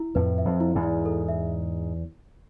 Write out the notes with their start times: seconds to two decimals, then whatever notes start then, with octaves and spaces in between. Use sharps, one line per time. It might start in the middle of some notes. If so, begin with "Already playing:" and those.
Already playing: E4
0.15 F2 A2 B4
0.38 E5
0.45 F2
0.60 E4
0.75 E2 G#2
0.83 E4
1.06 A4
1.28 E5